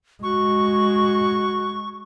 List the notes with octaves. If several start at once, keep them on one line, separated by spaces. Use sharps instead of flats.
G#3 F#4 C#6